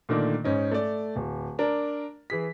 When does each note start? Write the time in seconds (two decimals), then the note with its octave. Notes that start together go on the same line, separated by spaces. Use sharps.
0.09 A#2 D3 D#3 A3 A#3 D4
0.44 G#2 C#4 D#4
0.72 A3 D5
1.16 D1
1.59 D4 A#4 D5
2.30 E3 G#4 B6